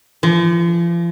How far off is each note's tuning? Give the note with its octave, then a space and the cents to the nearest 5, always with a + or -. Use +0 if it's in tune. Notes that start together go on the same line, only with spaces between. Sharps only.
F3 -40